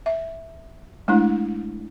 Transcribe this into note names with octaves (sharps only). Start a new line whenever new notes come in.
E5
G#3 A3 D4 E4